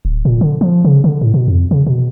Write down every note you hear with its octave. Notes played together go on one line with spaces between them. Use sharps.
D1
A#2
D3
F3
C#3
D3
A2
B2
F2
C#3
B2